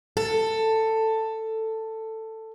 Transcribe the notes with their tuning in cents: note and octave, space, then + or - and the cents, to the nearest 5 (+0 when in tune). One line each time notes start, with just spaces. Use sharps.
A4 +10